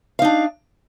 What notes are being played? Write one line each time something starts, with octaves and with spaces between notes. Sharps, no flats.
D4 D#4 F5